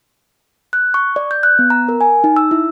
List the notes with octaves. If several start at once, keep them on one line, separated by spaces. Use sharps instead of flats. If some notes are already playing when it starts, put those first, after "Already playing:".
F#6
C#6
D5
G6
F#6
B3
A#5
A#4
G#5
D#4
E6
E4